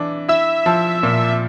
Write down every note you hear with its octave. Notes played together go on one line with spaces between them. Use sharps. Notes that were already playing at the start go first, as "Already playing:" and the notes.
Already playing: E3 D4
E4 E5
F3
A#2